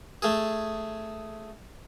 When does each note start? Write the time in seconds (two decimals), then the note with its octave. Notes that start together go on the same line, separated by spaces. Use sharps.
0.22 A3 G#4